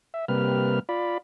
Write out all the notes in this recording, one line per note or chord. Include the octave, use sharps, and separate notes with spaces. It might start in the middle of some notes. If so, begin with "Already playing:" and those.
E5
C3 G3 A#3 B4 F6
F4 D5 B5